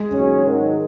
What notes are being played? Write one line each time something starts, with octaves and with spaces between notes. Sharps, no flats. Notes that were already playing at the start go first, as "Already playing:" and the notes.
Already playing: G#3 G#4
D#2 C#3 F#3 C#4
G#2 D#3 F#3